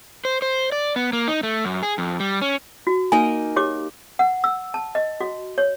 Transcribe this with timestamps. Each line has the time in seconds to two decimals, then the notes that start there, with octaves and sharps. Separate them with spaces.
0.25 C5
0.42 C5
0.72 D5
0.96 B3
1.13 A#3
1.28 D#4
1.43 A3
1.65 F#2
1.83 G#4
1.98 F2
2.20 G3
2.41 C#4
2.87 F#4
3.12 A#3 D#4 D#5 G#5
3.56 G4 C#5 D6
4.19 F#5
4.44 E6
4.74 A5
4.95 D#5
5.21 F#4
5.58 C#5